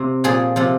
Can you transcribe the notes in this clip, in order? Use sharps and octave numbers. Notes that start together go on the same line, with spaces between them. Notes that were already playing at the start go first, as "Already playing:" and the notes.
Already playing: C3
A#2 F3 G#4
C3 F3